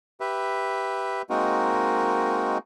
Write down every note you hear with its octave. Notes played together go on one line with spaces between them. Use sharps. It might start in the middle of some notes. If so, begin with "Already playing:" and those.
G4 B4 E5
G#3 A#3 C4 D#4 F#4 A#4